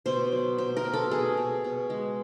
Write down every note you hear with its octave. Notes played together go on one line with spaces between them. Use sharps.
B2 C5
F#3
B2 C5
A#4
B2
A4
B2 G#4
B2
B2
G#3